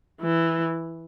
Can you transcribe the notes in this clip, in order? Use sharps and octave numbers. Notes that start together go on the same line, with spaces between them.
E3